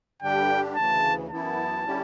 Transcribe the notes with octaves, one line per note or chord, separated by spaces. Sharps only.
G2 D3 G3 D4 G4 G5
D2 C#3 E3 A5
F#2 E3 B3 E4 A5
D3 G3 C#4 E4 G4